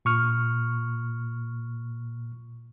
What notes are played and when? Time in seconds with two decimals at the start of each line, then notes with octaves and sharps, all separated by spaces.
0.05 A#2 C#6 F6